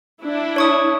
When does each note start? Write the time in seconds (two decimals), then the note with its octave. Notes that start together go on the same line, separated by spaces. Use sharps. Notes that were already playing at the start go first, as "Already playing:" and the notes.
0.21 D4 E4
0.56 C#5 C#6 D#6